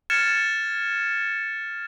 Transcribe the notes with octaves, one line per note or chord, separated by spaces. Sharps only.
F6 G#6 A6 C#7 E7